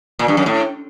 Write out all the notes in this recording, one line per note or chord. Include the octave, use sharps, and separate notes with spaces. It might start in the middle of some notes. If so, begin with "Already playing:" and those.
A#2
G2
F#2
A2